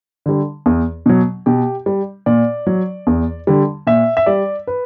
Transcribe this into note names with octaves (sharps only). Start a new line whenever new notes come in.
D3 G3
E2
B2 F#3
B2 G4
G3
A#2 D5
F#3
E2
D3 G3
A#2 E5
E5
G3 D5
B4